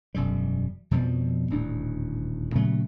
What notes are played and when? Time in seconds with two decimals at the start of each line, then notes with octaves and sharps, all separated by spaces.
0.15 E1 F#2 G3
0.91 F2 B2 F3 G3
1.50 D#1 D2 A2 D4
2.55 A#2 C#3 F#3 A3